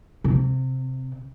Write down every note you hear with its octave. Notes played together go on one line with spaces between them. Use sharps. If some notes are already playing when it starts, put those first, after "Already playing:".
C3